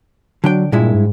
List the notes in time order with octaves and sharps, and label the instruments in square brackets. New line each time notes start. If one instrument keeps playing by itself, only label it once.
[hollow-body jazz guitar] D3 D4 G5 [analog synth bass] F#3
[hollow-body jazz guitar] G2 G#3 E4 [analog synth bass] A#2
[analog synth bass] G#2